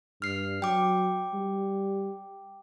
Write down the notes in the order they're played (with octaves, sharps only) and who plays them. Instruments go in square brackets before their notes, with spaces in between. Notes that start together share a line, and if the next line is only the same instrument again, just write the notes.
[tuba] G2 [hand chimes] F6 C7
[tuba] F#3 [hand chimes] G5 D6
[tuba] G3